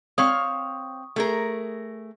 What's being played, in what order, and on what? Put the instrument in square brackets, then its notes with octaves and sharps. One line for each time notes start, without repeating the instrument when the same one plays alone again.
[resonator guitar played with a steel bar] C4 C#5 F5 [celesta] C#6 D#6
[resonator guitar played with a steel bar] A3 G#4 A#4